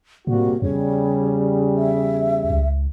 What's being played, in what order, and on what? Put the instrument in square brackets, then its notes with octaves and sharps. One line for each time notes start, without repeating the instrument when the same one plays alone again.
[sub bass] A2 [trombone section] C3 G3 F#4 [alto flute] A#3
[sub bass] E2 [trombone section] C#3 G3 [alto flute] C#5
[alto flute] E5
[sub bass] C#2